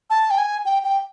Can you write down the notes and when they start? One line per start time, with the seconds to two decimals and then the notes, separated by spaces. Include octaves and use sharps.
0.10 A5
0.31 G5
0.38 G#5
0.65 G5
0.84 G5